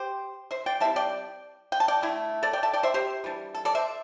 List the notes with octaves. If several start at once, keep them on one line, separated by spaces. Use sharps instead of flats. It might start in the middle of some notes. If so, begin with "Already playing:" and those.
Already playing: G4 C5
C5 E5
D5 G5
G3 C4 E4 E5 A5
D5 G5
G5
A5
D5 G5
D3 A3 E4
A4 D5
D5 G5
E5 A5
D5 G5
C5 E5
G4 C5
E3 G3 D4
A4
A4 D5
C5 E5